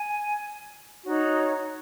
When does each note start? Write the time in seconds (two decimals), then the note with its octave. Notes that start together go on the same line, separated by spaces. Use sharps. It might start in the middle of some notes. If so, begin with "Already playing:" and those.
Already playing: G#5
1.05 D#4 F#4 C#5